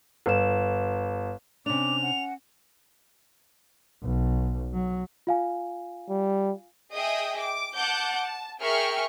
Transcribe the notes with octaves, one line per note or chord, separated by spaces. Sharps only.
G1 B4 E7
C3 C#4 D4 D6 F7
F#5
B1
F#3
F4 F5 G#5
G3
G#4 D#5 E5 G5 D#6
D6
F#5 A5 D6 G6
A5
G#4 A#4 E5 G5 C#6 F6